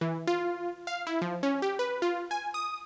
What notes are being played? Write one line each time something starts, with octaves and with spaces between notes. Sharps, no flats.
E3
F4
F5
E4
F3
C#4
G4
B4
F4
G#5
D#6